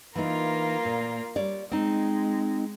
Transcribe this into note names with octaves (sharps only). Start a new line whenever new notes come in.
E3 A#3 D#4 F4 A#4
A#2
G3 C#5 D5
G#3 C4 D#4